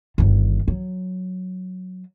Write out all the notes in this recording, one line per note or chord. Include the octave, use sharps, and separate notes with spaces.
G1 D#3
F#3